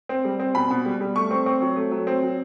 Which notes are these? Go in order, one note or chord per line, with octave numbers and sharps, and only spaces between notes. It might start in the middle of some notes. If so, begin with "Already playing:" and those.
C4
G3
C4
B2 B5
B2
G3
G3
A3 C#6
C4
C4
F#3
A3
F#3
C4
F#3